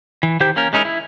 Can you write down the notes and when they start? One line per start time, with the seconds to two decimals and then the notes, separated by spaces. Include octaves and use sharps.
0.23 E3
0.40 D#3 G4 C5 G5 G6
0.56 A#3 C#4 A#4
0.73 G#3 C#4 D#4 E4 A#4
0.85 E4